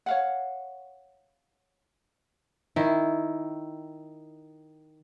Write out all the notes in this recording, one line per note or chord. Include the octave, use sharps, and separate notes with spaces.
C#5 F5 F#5
D#3 E4